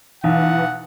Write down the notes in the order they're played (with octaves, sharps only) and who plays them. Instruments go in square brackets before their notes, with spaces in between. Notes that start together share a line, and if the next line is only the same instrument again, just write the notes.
[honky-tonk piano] B1 [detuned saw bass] E3 [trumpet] F#5